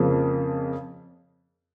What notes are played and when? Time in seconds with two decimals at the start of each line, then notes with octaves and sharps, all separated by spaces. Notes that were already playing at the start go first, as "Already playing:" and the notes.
Already playing: F2 C#3 F3 A#3